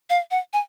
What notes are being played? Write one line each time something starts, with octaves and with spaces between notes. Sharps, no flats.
F5
F#5
G#5